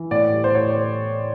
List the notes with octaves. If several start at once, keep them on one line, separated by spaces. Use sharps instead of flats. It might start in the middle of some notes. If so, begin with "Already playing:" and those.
Already playing: E3
A2 D5
G3
C5
A2 C#5